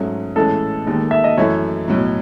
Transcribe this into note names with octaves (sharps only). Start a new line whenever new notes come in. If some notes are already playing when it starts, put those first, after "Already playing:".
Already playing: G#2 F#3 A3 C#4
A2 E3 G#3 C#4 A4
D#2 D#3 G#3
E5
D#5
F#2 E3 A3 E4 C#5
B1 A2 F#3